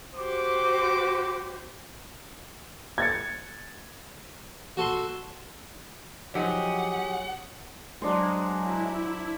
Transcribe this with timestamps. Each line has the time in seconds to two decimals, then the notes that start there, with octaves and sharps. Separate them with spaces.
0.16 F#4 G4 C5 D6
2.98 G#6 A6 C#7
4.77 F#4 A4 C6
6.35 F3 F#3 D#4 G4 G#4 F#5
8.02 F#3 G#3 D4 C5
8.61 E4